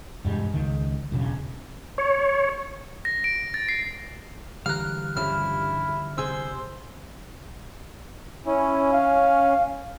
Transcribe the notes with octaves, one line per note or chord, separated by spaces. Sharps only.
E1 G2 G3 G#3
C#2 D#3
E1 B1 C#3
C#5
A#6
D7
A6
C7
D3 E3 G3 F5 A#5 F6 F#6
G2 C#3 F3 E4 F6
C3 G#4 C5 E6
C#4 E4
F5